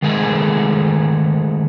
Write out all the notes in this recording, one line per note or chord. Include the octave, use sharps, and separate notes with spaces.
D#3 G#3 A3 G#4 A#4